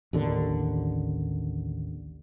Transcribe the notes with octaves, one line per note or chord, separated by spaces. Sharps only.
A1 D#2 D3